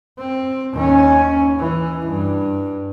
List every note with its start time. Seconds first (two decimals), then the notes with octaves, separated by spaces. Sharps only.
0.19 C4
0.74 D#2 C#4
1.58 E3
2.08 G2